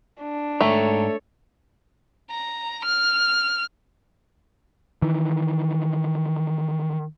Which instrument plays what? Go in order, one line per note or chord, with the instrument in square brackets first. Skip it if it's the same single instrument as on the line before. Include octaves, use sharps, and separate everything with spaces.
[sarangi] D4
[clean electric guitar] G#2 G5 A#5 [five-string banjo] A3 [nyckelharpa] A4 C#5
[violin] A#5
F6
[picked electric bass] D#3 E3